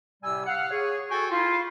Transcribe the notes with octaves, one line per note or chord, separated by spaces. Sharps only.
A2 C3 G3 G#5 E6
F5 F#5
G#4 C#5
F#4 A4 G5 G#5 C#6
E4 F4